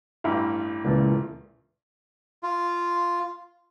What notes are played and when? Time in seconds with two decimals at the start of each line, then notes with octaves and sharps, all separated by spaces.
0.24 A1 G2 E4 E5 F5
0.85 C#2 A#2 E3 A5
2.43 F4